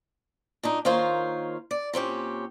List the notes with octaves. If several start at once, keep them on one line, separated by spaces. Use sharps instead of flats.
A#2 D4 D#4
D#3 A#3 F4 C5 C#5 F5
D5
A#2 C4 C#4 G4